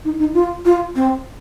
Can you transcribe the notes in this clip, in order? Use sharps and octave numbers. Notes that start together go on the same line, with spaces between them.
D#4
D#4
F4
F4
C4